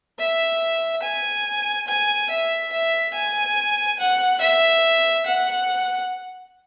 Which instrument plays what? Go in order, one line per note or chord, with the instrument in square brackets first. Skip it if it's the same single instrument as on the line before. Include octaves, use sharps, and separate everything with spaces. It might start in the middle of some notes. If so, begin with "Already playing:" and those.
[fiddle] E5
G#5
G#5
E5
E5
G#5
F#5
E5
F#5